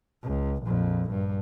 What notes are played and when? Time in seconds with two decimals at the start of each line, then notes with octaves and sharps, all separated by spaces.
0.23 C#2
0.63 A#1 F2
1.10 G2